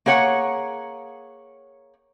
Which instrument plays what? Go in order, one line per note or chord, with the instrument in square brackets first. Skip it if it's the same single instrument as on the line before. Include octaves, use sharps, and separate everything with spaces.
[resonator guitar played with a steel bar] A#3 G#4 C#5 F#5